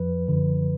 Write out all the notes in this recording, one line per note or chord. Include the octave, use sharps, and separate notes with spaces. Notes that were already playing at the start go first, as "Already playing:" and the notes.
Already playing: F2 F3 B4
F#2 D3 F3